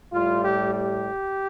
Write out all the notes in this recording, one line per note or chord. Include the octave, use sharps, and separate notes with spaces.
A2 G3 F4
G4
G4